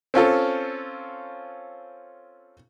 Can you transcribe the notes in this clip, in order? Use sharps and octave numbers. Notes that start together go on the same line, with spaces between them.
C4 C#4 F4 A4